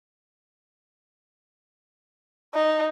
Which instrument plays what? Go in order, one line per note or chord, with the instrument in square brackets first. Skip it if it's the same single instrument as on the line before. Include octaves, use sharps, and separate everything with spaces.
[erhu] D#4